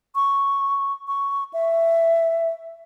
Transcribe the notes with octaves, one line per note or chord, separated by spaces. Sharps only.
C#6
C#6
E5